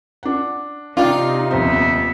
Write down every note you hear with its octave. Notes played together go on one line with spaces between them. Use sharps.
D4 F#5
C3 D4 D#4 F4 D5 G5
D#1 F2 B3 C5 E5